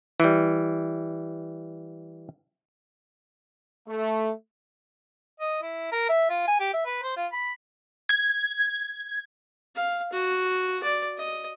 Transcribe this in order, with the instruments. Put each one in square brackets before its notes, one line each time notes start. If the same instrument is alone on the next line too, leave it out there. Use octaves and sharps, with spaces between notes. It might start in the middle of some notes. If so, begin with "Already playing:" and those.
[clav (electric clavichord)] E3 G3
[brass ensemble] A3
[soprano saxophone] D#5
E4
A#4
E5
F4
G#5
G4
E5
B4
C5
F4
B5
[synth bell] G#6
[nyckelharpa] F5
F#4
D5
D#5